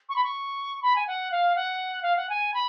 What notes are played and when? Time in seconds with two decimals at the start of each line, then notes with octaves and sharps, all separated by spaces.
0.09 C#6
0.15 B5
0.23 C#6
0.82 B5
0.95 G#5
1.07 F#5
1.31 F5
1.55 F#5
2.02 F5
2.16 F#5
2.29 G#5
2.53 B5